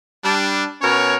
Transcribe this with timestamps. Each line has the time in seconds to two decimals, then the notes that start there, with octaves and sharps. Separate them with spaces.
0.24 G3 D4
0.82 B2 C#4 A#4 C#5